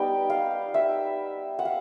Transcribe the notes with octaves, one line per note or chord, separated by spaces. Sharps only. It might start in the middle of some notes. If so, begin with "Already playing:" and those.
Already playing: G3 B3 D#4 G5
F5
E5
F#5
F5